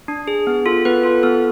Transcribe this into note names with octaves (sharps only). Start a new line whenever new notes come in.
D4
G#4
B3
F4 A4
B3 B4
F4 A4
B3 A4